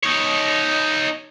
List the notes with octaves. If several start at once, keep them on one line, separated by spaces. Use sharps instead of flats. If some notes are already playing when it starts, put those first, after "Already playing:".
D#4 C#5